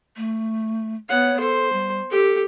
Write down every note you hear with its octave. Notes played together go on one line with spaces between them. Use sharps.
A3
B3 C#5 F#5
A4 C5
G3
G4 A4